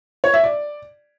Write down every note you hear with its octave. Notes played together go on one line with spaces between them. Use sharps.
C#5
E5
D5